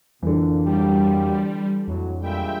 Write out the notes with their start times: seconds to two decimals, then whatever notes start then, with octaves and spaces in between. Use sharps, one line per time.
0.22 F2 A#2 D3 E3
0.64 F#3 G3 A#3 G4
1.88 F2 A2 F#3 F#4
2.21 A#2 G3 G#3 E5 G5